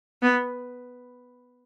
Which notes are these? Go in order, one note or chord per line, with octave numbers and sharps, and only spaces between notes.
B3